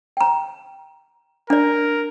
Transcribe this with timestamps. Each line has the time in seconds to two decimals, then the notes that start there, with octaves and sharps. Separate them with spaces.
0.17 G5 A#5
1.50 D4 A#4 D5